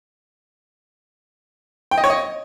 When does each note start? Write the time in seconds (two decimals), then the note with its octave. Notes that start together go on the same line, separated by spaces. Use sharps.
1.91 G5
1.98 D#5
2.04 C#5
2.10 D#5